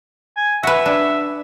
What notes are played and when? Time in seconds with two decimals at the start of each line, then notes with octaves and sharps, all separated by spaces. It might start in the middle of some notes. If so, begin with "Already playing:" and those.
0.37 G#5
0.63 F#4 B4 E5
0.86 D4